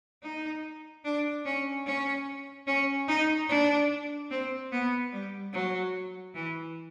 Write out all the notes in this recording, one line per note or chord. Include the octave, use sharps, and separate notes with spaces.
D#4
D4
C#4
C#4
C#4
D#4
D4
C4
B3
G3
F#3
E3